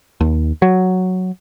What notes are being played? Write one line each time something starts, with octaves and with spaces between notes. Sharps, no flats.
D#2
F#3